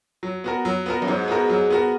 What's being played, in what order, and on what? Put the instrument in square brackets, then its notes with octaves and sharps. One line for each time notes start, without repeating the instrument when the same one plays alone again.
[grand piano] F#3
B3 F#4 A#4
F#3
B3 F#4 A#4
[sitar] F#2
[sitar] G#2 [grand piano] F#3
[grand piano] B3 F#4 A#4
F#3
B3 F#4 A#4